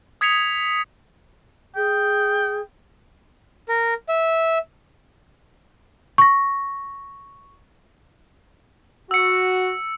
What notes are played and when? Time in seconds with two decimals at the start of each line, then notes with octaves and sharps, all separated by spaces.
0.21 D#6 G#6 B6 C#7 F7
1.76 G#4 G5
3.69 A#4
4.09 E5
6.18 C#6 A#6
9.11 F#4 E6 C#7